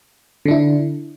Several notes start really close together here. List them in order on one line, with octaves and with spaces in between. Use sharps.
D3 D4 E4